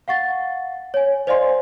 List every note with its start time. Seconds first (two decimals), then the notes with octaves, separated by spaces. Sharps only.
0.08 F5 F#5 C#6 A6
0.94 C#5 G#5
1.27 C5 D5 D#5 F5 G#5 C6